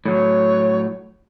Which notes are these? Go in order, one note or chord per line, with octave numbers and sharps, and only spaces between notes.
A2 F#3 C#5